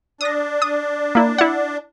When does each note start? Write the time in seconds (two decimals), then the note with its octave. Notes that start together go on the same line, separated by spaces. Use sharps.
0.21 D4 D#6 A#6
0.62 D#6
1.15 A#3 E4
1.38 E4 F#5